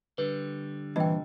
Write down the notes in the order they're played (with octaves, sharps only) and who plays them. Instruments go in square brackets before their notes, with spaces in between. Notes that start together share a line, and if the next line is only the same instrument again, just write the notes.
[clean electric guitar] D3 G3 [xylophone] B4
[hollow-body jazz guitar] G2 A#2 C4 [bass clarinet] E3 [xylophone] D#5 G5